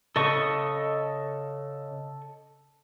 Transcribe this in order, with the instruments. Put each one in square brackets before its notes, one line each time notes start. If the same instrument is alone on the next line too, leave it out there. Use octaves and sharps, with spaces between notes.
[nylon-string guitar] C#3 [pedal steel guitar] A4 D#5 C#6